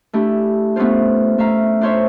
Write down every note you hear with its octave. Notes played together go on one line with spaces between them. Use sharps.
A3 D4 E4 G4
A3 B3 C#4 D4 F4 C5
A3 E5 F5 A#5
D4 F4 C5 C#5 E5